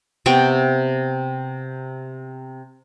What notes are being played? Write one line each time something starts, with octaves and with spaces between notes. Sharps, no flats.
C3 B3 G5 C#6